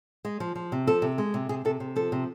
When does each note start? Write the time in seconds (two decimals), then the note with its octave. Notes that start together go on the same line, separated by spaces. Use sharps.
0.25 G#3
0.40 F3
0.55 F3
0.72 C3
0.87 F3 A4
1.02 C3
1.18 G#3
1.34 C3
1.49 C3 G#4
1.65 C3 A4
1.80 C3
1.96 F3 A4
2.12 C3